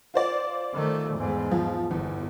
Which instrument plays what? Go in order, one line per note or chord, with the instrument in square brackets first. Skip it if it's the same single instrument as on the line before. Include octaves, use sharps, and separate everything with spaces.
[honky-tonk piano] F4 C5 D5
[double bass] D#3 A3
E2 G#2
[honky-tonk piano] F3
[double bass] G1 [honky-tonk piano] E2